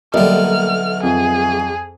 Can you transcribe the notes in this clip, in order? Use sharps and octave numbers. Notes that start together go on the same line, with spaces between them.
B1 D3 G3 A#3 D#5 E5 F6
F2 G#4